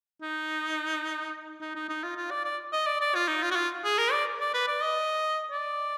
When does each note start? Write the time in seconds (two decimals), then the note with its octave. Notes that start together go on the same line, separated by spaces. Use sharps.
0.22 D#4
1.61 D#4
1.75 D#4
1.89 D#4
2.03 F4
2.17 F4
2.31 D5
2.45 D5
2.73 D#5
2.86 D5
3.01 D5
3.15 F4
3.28 D#4
3.42 F4
3.51 F#4
3.56 F4
3.84 G#4
3.98 A#4
4.12 D5
4.40 D5
4.54 B4
4.67 D5
4.82 D#5
5.51 D5